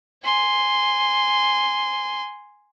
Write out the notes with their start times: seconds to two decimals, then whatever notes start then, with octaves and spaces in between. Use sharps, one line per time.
0.24 G#5 C6